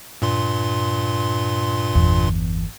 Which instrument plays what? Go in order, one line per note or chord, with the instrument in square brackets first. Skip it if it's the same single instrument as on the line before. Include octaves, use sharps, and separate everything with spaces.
[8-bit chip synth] G2 A#2 C6
[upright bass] G1 E2